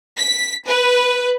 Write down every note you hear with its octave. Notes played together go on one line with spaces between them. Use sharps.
B6
B4